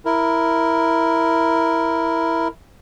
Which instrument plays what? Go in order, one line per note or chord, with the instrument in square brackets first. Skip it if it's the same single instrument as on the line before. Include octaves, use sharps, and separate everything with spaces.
[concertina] E4 A#4